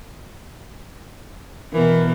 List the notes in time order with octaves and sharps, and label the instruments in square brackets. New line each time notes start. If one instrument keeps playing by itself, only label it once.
[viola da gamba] B2 E3 [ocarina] A#4